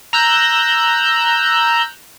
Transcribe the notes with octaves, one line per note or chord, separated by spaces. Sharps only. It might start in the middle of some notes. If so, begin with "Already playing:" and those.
A#5 E6 F#6 G6